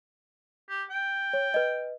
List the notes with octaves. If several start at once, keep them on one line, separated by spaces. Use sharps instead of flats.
G4
G5
C#5
B4 D#5